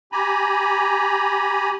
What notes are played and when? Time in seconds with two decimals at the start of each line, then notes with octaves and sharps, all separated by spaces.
0.12 G4 G#5 A#5 B5